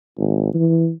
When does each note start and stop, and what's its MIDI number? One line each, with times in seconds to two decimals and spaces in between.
0.18 0.53 32
0.54 0.91 52